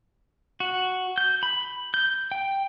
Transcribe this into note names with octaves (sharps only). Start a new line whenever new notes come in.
F#4
G6
B5
G6
G5